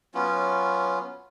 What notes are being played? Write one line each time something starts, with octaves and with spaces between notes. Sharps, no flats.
F#3 B3 C#4 F4